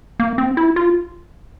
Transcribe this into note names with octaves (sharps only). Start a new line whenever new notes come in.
A#3
C4
E4
F4